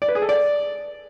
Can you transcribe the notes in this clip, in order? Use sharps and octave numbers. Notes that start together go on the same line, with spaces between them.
D5
B4
G#4
A4
D5